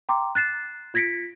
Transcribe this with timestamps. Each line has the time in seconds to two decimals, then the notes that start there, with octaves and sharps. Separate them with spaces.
0.09 G5 A#5 C6 D6
0.35 F#6 A6 C7 E7
0.94 F4 G#6 A#6 B6 C#7 D7